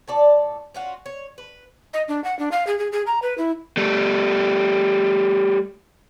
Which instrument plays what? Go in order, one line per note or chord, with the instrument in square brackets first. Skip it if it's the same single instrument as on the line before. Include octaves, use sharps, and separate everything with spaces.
[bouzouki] A2 A4 D5
C#4 F4 F#4
C#5
B4
[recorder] D#5
D4
F#5
D4
F5
G#4
G#4
G#4
A#5
B4
E4
[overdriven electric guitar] G3 A3